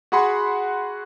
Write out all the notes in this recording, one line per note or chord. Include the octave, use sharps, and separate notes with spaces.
F#4 G#4 F#5 B5 C6